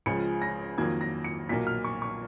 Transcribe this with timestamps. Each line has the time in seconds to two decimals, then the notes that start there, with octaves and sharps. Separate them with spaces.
0.06 C#2 C#3 F3 G#3 C#7
0.42 A#6
0.78 F2 D#3 F#3 A#3 G#6
1.01 A#6
1.24 C#7
1.49 B1 A#2 F#3 A#3 B6
1.67 F6
1.84 C#6
2.02 C#6